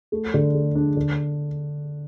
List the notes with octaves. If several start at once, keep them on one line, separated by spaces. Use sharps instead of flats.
A3
D3
A3
D4
D3